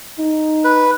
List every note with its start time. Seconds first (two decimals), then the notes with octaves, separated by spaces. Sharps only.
0.19 D#4
0.64 B4